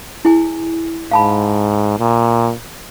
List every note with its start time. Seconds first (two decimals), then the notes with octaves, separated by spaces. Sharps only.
0.25 E4 G#4 G#5
1.11 G#2 F5 A5 B5
1.99 A#2